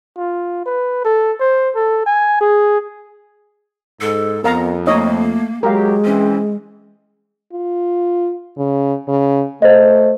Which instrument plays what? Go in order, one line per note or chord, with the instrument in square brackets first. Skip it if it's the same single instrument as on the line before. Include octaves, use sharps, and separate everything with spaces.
[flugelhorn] F4
B4
A4
C5
A4
G#5
G#4
[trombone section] G#2 [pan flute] A4
[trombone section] F2 [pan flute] B3 [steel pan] A#4 F5 A#5
[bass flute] A3 [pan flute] A#3 [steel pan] D#4 C#5 D#5
[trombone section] F#3 G4 [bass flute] G#3 [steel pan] A#4 F5
[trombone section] E3 C4 [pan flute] C#4
[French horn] F4
C#3
C#3
[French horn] A3 [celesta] C5 D#5